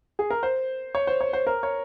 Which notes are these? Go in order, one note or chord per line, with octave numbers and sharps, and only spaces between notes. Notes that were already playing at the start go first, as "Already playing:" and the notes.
G#4
A#4
C5
C#5
C5
C#5
C5
A#4
C#5